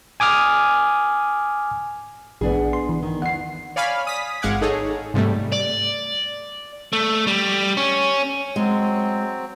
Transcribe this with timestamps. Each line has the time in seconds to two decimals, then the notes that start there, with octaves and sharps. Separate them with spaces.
0.20 G#5 D6 D#6 F6
2.41 A#1 E3 B3 D4 G#4
2.73 C6
2.89 E3
3.03 D#3
3.22 E2 F#5 C7
3.76 C#5 D5 F5 G#5 B5 F6
4.07 D#6 B6
4.42 G#1 G#3 F5 F#5 D6 G#6
4.61 D#4 G#4 A4 C#5
5.14 G#2 C3 G3 A3
5.52 D5
6.93 A3
7.27 G3
7.77 C#4
8.56 F#3 G#3 C4